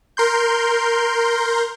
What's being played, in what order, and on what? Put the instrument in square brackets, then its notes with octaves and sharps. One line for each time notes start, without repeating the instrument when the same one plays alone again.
[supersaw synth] A#4 C6 G6